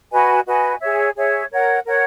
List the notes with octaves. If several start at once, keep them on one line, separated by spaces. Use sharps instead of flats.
F#4 B4 D#5 G#5
F#4 B4 D#5 G#5
G#4 C#5 E5
G#4 C#5 E5
A#4 C#5 F#5
A#4 C#5 F#5